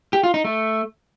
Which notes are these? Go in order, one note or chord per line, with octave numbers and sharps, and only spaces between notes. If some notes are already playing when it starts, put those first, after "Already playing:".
G4
F4
D#4
A3